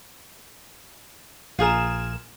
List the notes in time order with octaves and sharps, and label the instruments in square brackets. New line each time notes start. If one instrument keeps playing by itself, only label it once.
[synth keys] A#1 E7 [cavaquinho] F4 G#4 A#4